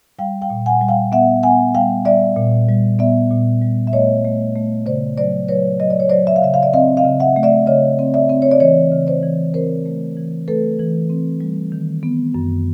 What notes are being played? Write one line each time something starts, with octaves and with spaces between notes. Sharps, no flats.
G3 F5 G5
F5 G5
A#2
F#5 G#5
G3
F5 G5
B3 E5 F#5
B3 F#5 G#5
G3 F5 G5
G3 D5 E5
A#2
G3
B3 D5 E5
A#2
G3
E5
A3 C#5 D#5
A3
A3
C#3 C5 D5
F#3 C5 D5
F#3 B4 C#5
F#3 D#5
D5
C#5
F#3 C5 D5
E5
F5
C#3 E5
F5
D5 E5
C4 D#5 F5
D#5 F5
C#3
E5 F#5
A3
D5 E5
C#3 C#5 D#5
C4
D5 E5
C4
C#5
D5
E3 C#5 D#5
C#3
C5 D5
E3
C4 A#4 C5
A3
E3
A3 A4 B4
E3
C4
G3
D#3
B3
F#2